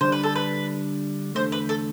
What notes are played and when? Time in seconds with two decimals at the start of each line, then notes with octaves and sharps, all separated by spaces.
0.01 D3 G3 D4 C5
0.12 B4
0.24 A4
0.35 B4
1.35 E2 D3 A3 C5
1.52 B4
1.69 A4